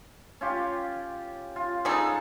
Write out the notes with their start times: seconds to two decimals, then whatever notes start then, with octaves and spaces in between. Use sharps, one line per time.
0.41 C#4 F4 G4
1.56 F4
1.85 G3 G#3 D#4 G#4 A4